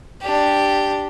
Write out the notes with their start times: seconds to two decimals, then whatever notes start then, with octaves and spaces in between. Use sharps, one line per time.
0.22 D4 G4